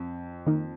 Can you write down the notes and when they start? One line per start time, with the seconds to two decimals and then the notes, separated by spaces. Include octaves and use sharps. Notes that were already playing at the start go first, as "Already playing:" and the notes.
Already playing: F2
0.46 D#3 A#3 D#4 A#4